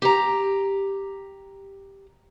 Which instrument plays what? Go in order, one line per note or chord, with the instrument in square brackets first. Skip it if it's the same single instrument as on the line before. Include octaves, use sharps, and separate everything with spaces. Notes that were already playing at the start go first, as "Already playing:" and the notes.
[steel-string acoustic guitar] G4 A#5